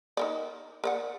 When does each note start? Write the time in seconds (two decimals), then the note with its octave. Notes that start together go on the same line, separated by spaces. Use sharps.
0.17 D#4 A#4 D5
0.84 A#4 D5 F#5